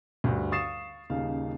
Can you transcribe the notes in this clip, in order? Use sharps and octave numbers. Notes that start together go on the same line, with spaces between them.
D2 G2
F5 C#6 D#6 A6 C7 E7
D#1 C#3 D#4 F5